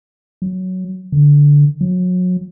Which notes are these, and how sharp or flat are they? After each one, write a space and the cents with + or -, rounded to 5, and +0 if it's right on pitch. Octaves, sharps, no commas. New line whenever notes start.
F#3 +5
D3 -15
F#3 -30